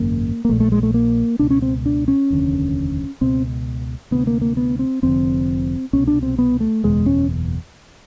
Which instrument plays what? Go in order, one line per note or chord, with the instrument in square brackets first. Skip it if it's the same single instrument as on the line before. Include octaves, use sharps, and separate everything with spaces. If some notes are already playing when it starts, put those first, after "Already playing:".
Already playing: [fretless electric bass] G#1 F#2 C#3 A#3
A#3
A#1 A#2 A3
A3
G#3
A3
A#3
C#2 B2 D4
C#4
C4
D4
C#4
F1 D#2 D3
C#2 B2 C4
D2 C3 B3
A#3
A#3
B3
C4
F1 F2 D3 C4
C2 B2 C#4
D4
C4
B3
A3
F#1 E2 B2 G#3
C#4